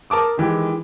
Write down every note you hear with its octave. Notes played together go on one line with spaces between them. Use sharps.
A#4 A5 D6 D#6
D#3 E3 G#3 G4